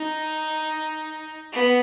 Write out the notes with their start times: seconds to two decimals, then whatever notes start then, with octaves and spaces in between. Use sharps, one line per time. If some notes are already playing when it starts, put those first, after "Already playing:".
Already playing: D#4
1.52 B3